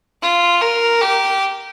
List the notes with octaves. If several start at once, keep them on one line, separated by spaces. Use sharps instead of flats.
F4
A#4
G4